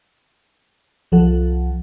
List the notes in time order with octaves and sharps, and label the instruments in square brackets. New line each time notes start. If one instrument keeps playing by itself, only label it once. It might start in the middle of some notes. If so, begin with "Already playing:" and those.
[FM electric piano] C2 F3 A4 F#5